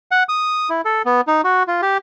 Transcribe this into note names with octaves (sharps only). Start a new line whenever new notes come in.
F#5
D#6
E4
A4
B3
D#4
F#4
F4
G4